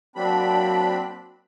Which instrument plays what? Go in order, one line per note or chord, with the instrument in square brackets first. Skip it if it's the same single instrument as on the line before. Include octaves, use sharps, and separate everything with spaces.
[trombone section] F#3 A#3 F#4 [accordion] C4 D4 B5